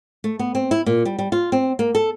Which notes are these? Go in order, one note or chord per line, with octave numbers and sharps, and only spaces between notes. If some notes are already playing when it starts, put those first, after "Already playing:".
A3
B3
C4
E4
A#2
G3
G3
F4
C4
A#3
A4